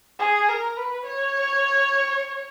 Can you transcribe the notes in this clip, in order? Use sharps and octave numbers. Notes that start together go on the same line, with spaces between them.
G#4
A#4
B4
C#5